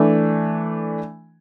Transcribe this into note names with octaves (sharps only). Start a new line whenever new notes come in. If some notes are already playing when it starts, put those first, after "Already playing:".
Already playing: E3 A3 D4